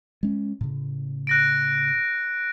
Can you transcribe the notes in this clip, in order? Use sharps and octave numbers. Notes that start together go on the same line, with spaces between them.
G#3 C#4
A2 C#3
F#6 A#6 D7